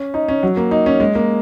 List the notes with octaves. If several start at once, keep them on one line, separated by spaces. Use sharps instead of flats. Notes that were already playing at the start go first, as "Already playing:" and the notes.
Already playing: C#4
D#4
C#4
F#3
A#3
D#4
C#4
G#3
A#3